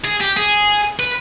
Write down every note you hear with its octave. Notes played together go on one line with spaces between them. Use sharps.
G#4
G4
G#4
B4